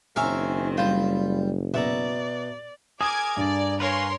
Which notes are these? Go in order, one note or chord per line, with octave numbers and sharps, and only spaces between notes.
F#1 D#3 C4 A#4 C#5 E5 F5 G#5
G3 F4 B4 C5
B2 D5 E5 A#5
G#4 A#4 G#5 D6 D#6 G#6 E7
G2 D5
A#4 B4 C#5 F5 G#5 C6